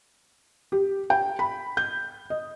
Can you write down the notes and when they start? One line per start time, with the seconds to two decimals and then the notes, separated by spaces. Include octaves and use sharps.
0.72 G4
1.10 G5
1.39 B5
1.77 G6
2.30 D#5